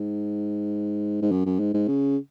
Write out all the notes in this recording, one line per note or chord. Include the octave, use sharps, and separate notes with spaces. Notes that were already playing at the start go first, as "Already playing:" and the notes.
Already playing: G#2
G#2
F#2
F#2
G#2
G#2
C#3